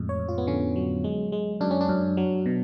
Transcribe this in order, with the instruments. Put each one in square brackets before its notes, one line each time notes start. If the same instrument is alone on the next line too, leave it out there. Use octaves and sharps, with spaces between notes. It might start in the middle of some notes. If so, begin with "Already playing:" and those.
Already playing: [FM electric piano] F2 A2 G#3
C#5
F2
F4
B3
D3 C#4
F#3
G#3
G#3
F#2 D4
C#4
D4
F#2
F#3
B2